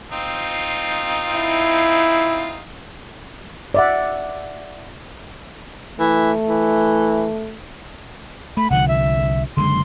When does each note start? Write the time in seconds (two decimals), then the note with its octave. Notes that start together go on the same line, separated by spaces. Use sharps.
0.12 C4 D#4 F4
1.33 E4
3.74 D5 E5 F#5
6.00 E3 A3
6.48 E3
8.57 A3 B5
8.70 C2 D3 F3 F#5
8.88 E5
9.57 F#1 D3 G#3 C6